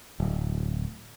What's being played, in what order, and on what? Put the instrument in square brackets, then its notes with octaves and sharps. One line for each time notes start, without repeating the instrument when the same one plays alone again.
[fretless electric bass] D1